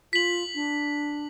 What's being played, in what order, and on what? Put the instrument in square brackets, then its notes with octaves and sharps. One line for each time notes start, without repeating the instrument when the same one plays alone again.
[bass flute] F4 [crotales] B6 F#7
[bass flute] D4